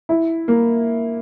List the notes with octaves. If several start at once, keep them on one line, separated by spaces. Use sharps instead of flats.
E4
A#3